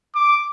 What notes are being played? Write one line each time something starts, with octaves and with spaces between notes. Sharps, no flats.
D6